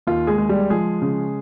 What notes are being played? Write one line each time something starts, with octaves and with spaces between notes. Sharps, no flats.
D#2 F4
G#3 G#4
G#3
G3 G4
F3 G#3 G#4
C#3